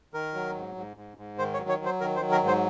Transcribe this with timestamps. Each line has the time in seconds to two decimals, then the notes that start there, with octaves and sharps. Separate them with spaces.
0.14 D#3 A#4
0.34 F#3
0.55 G#2
0.76 G#2
0.97 G#2
1.17 G#2
1.38 D#3 C5
1.54 C#5
1.59 F#3
1.69 C#5
1.79 F#3
1.85 C5
2.01 D#3 A#4
2.16 C5
2.21 F#3
2.32 A#4
2.42 G#2
2.48 C5